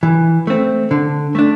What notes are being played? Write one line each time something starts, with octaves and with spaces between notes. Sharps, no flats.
E3
A3 C4
D3
A3 D4